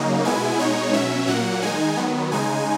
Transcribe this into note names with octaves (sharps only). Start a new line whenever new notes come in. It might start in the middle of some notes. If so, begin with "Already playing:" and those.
Already playing: C#3 F#3 A#3 D#4
B2 G#3 B3 E4 G#5
B2 G#3 D#4 C#5
B2 F#3 C#4 E5
A#2 F#3 A#3 F#5
D#3 G#3 D#4 G#5
D#3 F#3 B3
C#3 G#3 D#4 G#5